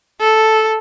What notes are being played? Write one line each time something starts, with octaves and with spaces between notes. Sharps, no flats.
A4